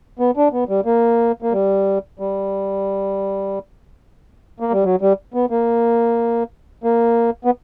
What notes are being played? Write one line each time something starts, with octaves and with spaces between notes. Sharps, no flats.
B3
D4
B3
G3
A#3
A#3
G3
G3
A#3
G3
F#3
G3
B3
A#3
A#3
B3